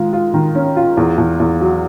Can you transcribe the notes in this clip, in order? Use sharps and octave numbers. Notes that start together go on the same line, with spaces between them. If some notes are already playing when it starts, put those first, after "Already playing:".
Already playing: D#3 G#3 F4
F4
D#3
C#4
F4
E2
E2
E2
F#3